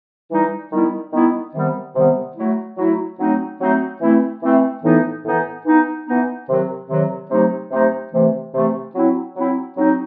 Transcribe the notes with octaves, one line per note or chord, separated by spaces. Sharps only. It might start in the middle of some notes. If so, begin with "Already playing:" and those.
E3 G3 D#4
D#3 G3 B3 E4
D#3 G3 B3 E4
C3 D#3 G3 B3
C3 D#3 G3 B3
F#3 A3 E4
F#3 A3 E4
F#3 A3 C4 D#4
F#3 A3 C4 D#4
E3 A3 C4 E4
E3 A3 C4 E4
A2 E3 B3 D#4
A2 E3 B3 D#4
E3 B3 D#4
E3 B3 D#4
C3 D#3 F#3
C3 D#3 F#3
C3 F#3 A3 D#4
C3 F#3 A3 D#4
C3 E3 A3
C3 E3 A3
F#3 C4 E4
F#3 C4 E4
F#3 C4 D#4